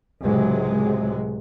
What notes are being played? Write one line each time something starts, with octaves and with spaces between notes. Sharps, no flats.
C#2 A2 C3 F#3 G#3